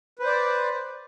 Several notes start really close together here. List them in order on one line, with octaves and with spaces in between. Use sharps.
B4 C5 D5